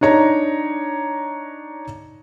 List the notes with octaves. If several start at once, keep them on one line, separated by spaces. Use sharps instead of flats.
D4 D#4 C#5 A#5